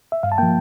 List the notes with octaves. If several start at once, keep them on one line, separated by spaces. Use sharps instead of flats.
E5
G2 F5
A5
F3 A#3 G5